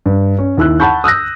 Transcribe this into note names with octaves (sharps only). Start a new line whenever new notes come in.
G2
C#4
D#2 E4 E6 F#6
F#5 A5 B5 C#6 G6
D#6 E6 F#6 A#6